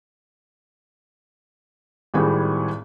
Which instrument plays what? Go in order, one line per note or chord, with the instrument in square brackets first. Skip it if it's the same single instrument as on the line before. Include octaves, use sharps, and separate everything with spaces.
[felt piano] G#1 A2 G3 C4 G#4